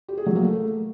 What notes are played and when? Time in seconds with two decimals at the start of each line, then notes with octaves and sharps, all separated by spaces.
0.08 G4
0.17 G#4
0.26 F#3
0.35 A#3
0.44 A3